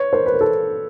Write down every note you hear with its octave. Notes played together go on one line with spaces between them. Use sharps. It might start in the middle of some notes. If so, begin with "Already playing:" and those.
Already playing: B4 C#5
A#4 C5
B4
A#4
A4